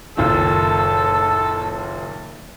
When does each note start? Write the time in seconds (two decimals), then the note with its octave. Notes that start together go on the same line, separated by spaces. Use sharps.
0.17 F#1 A#2 D#3 A4